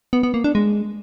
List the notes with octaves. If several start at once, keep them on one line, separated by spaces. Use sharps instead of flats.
B3
B3
A#3
D4
G#3